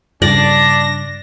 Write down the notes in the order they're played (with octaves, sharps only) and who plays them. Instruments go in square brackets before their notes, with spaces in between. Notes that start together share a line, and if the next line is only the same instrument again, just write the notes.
[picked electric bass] G2 C#3 [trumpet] D4 [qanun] D5 [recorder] A#6